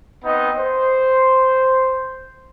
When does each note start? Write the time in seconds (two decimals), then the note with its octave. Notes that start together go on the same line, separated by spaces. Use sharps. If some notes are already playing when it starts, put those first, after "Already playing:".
0.24 B3 C4 D#4 B4 D#5
0.57 C5